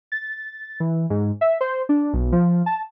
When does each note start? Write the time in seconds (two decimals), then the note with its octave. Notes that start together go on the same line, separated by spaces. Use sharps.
0.12 A6
0.80 E3
1.10 G#2
1.41 E5
1.61 C5
1.89 D4
2.13 B1
2.32 F3
2.66 A5